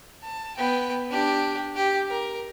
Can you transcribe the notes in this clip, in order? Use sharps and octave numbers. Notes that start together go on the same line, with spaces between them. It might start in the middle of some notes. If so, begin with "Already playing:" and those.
A5
B3 G5
D4 G4
G4
A#4